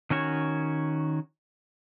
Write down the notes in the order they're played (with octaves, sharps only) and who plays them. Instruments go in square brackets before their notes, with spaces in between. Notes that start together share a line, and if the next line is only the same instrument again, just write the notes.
[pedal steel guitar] D#3 C#4 F#4 C#5